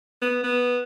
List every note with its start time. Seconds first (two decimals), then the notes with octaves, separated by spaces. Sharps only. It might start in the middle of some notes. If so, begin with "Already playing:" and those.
0.22 B3
0.44 B3